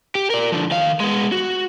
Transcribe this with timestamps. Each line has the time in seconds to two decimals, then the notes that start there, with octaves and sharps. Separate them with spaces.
0.15 G4
0.30 A#4 D5
0.52 D3 F3
0.71 D#3 F5
1.00 G#3 B3
1.32 F#4